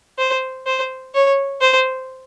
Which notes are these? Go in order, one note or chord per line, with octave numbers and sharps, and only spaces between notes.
C5
C5
C#5
C5